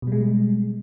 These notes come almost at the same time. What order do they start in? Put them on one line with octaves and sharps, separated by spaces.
B2 G3 G#3